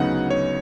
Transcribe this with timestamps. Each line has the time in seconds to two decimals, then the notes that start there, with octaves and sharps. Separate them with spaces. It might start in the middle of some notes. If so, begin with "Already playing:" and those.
Already playing: D2 C#3 F#3 B3 D#4 F#5
0.30 C#5